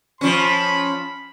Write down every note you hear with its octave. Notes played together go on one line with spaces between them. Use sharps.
F3 C#4 B5